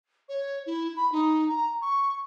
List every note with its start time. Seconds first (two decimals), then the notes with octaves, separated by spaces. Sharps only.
0.29 C#5
0.66 E4
0.96 B5
1.12 D#4
1.48 A#5
1.82 C#6